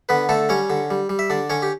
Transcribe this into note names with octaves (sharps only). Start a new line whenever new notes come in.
D3 B3 B4
D3 A3 A4
G3 C#4 C#5
D3
G3
G3
E5
D3 D4 D5
D3 C#4 C#5
G4